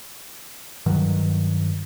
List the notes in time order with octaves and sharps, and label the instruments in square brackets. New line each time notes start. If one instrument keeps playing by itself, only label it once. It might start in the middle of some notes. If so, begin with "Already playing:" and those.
[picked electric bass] G2 D#3 F#3